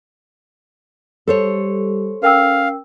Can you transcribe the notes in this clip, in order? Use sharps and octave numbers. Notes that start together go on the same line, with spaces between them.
G3 A4 C5 C#5
C#4 A#4 F5 G5 E6